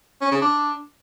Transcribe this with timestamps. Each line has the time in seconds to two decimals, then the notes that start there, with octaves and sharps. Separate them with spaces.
0.21 C#4
0.31 C#3
0.41 D4